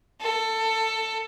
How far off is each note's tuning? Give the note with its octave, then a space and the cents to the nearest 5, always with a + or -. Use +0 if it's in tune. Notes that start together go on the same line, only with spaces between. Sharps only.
A4 +15